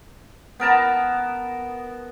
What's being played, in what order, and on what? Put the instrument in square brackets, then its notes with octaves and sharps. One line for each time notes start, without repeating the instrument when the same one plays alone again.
[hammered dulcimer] B3 A#4 A5 B5